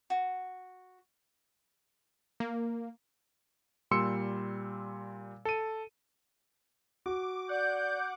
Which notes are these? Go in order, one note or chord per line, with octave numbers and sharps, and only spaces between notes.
F#4
A#3
A#2 G3 C6 E6 C#7
A4 D#7
F#4 D6
D5 F#5 D6 G6